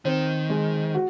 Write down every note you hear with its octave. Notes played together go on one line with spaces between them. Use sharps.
D#3 C4
G#3
F#4